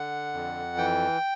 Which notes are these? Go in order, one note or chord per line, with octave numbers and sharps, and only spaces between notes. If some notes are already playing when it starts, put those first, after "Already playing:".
Already playing: D3 F#5
F2
E3 G5